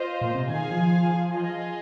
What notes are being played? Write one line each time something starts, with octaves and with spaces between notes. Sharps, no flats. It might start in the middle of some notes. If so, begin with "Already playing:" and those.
Already playing: F4 C5 D#5
A#2
C3
D#3 G#4 F5 G#5
F3
F4 G#4 D#5